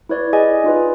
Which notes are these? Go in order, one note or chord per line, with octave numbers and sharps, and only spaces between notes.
E4 B4 C#5 D5
G#4 D5 D#5 G#5
D#4 F4 B4